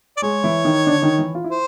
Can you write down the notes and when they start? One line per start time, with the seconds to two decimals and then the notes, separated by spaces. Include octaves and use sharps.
0.17 D5
0.22 G#3 G#4 C#5
0.44 E3 E4
0.65 D#3 D#4
0.87 D3 D4
0.97 D4
1.02 D#3 D#4
1.18 E3 E4
1.35 F4
1.44 E4
1.50 C5